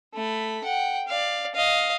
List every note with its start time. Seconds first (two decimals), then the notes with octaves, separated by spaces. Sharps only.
0.14 A3 B5
0.64 F#5 G5
1.07 D5 F5
1.54 D#5 F5